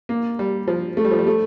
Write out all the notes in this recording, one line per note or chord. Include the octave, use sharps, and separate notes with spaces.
A#3
G3
F3
A3
G3
F3
G3
A3